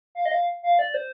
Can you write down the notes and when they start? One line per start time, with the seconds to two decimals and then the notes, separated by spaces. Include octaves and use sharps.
0.15 F5
0.25 D#5
0.31 F5
0.63 F5
0.79 D5
0.94 C5